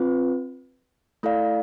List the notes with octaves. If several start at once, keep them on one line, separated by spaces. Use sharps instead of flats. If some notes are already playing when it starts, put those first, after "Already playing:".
Already playing: C4 F4 B4
A3 E4 A4 D5 F5